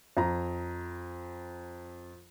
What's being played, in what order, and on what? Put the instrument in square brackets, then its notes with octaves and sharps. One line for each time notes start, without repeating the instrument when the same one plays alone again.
[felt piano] F2 A#5